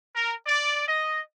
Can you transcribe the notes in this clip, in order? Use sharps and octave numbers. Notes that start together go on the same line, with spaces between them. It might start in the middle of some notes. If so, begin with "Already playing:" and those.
A#4
D5
D#5